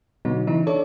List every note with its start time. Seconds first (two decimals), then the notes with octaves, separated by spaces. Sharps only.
0.25 B2 D3 F#3 B3 D#4
0.47 C#3 E3 D#4 E4
0.67 D4 A4 C#5 D5